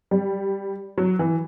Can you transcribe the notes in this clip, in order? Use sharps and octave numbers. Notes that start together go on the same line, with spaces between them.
G3
F#3
E3